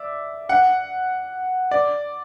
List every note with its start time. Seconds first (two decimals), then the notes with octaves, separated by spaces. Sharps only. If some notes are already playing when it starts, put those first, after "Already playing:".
Already playing: D5 E5
0.49 F#5
1.71 D5